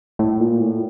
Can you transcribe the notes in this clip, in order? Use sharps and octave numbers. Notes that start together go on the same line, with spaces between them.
A2
A#2
A2